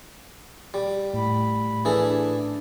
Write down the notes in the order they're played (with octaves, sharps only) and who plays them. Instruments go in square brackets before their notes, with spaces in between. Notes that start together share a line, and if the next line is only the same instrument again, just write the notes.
[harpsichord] G3
[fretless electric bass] A2 [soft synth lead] B5
[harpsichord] E3 G#4 A4 [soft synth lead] D4